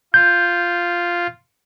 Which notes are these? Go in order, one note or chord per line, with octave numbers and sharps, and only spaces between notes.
F4 G6